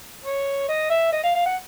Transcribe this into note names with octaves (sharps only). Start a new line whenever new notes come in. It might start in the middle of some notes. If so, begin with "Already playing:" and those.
C#5
D#5
E5
D#5
F5
F5
F#5